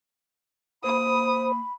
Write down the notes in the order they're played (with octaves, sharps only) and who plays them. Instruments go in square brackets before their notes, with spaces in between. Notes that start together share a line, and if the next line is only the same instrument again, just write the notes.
[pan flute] A#3 [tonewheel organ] C5 [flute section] B5 [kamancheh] D#6